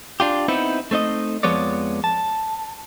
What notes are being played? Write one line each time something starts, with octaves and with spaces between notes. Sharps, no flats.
D4 F4 G4
B3 C4 D#4 E4
A3 C4 D#4 D#5
F2 F3 G#3 B3 C#5 D5
A5